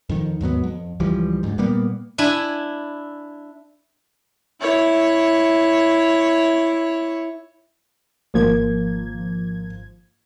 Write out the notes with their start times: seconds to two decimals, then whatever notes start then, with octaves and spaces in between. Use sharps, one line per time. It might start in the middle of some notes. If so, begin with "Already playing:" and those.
0.09 F2 D#3
0.41 D#2 G#2 F#3 B3
0.64 F2
1.00 C#2 E3 F3 G3
1.43 D2 G#2
1.58 A#2 G3 A#3 B3
2.18 D4 E4 G#5
4.61 E4 C#5
8.34 G#1 F3 A#3 G#6